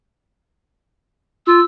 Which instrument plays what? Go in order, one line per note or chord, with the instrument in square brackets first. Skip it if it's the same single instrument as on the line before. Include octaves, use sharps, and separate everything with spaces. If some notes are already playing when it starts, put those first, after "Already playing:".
[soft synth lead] F4 [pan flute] E6